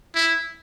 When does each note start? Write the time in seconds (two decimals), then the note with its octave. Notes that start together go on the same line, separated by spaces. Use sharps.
0.15 E4